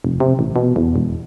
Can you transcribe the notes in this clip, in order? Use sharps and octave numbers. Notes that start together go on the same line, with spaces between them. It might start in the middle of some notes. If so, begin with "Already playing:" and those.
F1
C3
A1
B2
E2
E1